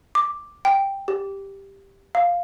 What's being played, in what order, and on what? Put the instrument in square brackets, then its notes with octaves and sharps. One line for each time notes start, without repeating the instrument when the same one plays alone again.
[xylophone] D6
G5
G4
F5